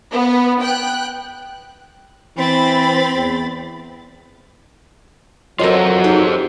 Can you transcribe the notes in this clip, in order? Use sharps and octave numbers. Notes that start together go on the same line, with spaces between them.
B3
G5 F#6
E3 C4 B5 A6
E2
F#2 F#3 F4 A4 A#4 C5 C#5 D#5
D#4 G4 G#4